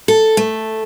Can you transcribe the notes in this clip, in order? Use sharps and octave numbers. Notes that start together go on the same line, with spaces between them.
A4
A3